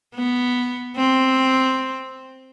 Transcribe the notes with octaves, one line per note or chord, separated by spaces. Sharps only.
B3
C4